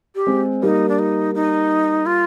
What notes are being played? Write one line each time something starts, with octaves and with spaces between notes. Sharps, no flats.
G4
G#3 C4
G3 A#3 D#4
D4
D#4
D#4
F4